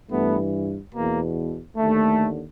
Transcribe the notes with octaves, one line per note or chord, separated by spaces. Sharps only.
G2 E3 A3 B3
E2 B2 A#3
D#2 D3 A3